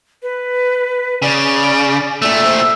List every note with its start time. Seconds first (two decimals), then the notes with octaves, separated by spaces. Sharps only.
0.23 B4
1.22 C#3 D5
2.22 A#2 A3 D5
2.44 C5